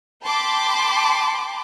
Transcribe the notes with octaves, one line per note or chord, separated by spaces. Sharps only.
G5 A5 B5 C6 D6